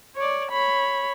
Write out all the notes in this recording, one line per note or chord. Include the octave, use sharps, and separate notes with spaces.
C#5 D5
C#5 B5